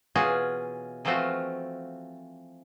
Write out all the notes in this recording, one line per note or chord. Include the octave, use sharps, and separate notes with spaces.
B2 E3 C#4 F4 F#4 G#4
E3 F3 A3 C4 F4 F#4